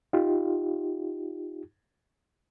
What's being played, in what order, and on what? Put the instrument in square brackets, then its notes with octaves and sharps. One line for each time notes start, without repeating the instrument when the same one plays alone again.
[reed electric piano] D#4 F4 G4